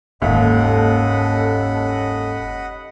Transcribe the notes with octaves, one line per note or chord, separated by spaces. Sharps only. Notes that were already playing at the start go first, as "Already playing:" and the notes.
F#1 D#2 G#2 C#4 A4 D#5 F#5 B5